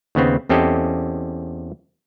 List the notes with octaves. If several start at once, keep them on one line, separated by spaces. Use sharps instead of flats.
D#2 C#3 B3 C4
E2 C4 C#4 G4 A4 D#5